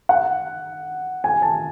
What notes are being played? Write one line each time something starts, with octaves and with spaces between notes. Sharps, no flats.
F#5
G#5
A5